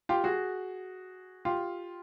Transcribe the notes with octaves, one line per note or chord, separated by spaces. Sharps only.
F4 G4
F#4 G#4
F4 G4